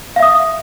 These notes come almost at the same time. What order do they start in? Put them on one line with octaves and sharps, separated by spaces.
F5 E5 D#6